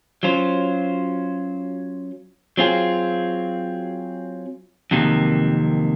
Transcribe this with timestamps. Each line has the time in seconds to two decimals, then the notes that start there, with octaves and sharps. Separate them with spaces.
0.23 F#3 C#4 F4 C5
2.57 F#3 C4 F4 G#4
4.91 F2 C3 D#3 F#3 A#3